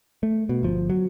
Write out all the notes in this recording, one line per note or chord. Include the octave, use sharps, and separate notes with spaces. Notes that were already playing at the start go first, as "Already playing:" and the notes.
A3
B2
G1 F3
F#3